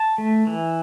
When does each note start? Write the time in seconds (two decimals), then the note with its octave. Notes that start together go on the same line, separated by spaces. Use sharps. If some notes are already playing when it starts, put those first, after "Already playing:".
Already playing: A5
0.18 A3
0.47 E3